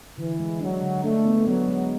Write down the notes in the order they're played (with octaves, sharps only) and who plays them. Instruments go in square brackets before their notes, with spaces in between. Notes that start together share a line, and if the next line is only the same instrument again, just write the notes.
[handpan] D3 [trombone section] E3
[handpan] G#3
[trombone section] F#3 [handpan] D4
[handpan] D3
[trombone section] A3 [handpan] D4
[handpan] B3
[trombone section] F#3 [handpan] B3
[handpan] G#3